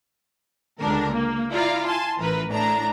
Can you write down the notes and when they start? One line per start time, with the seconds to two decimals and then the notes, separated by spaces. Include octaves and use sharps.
0.79 C#2 D3 D4 A#4
1.11 A#3
1.52 E4 F4 D5 F5 A#5
1.86 G#5 A5 C6
2.18 A1 E3 A#4 B4
2.49 A2 D4 A#5